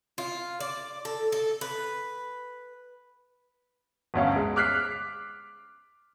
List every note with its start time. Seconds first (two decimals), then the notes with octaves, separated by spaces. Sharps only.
0.18 F4
0.60 D5
1.05 A4
1.32 A4
1.61 B4
4.14 G1 D2 C#4 F5
4.36 G#3
4.56 D6 F6 F#6 B6 C7